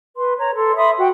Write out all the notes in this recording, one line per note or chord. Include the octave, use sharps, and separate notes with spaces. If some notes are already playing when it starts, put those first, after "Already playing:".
B4 C6
C#5 A#5
A4 C6
E5 B5 C6 D#6
F#4 G5